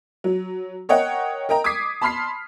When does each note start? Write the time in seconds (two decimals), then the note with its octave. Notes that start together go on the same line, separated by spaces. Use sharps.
0.24 F#3
0.89 A#4 C#5 D#5 F#5 G5
1.49 A#4 D#5 G5 A#5
1.64 D6 D#6 G#6 B6 C7
2.01 A5 B5 C6 F6 B6 C7